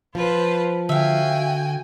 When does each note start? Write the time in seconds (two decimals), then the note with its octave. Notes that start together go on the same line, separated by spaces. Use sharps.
0.15 F3 F4 B4 C5
0.89 D3 F#4 E5 F5 G5 G#5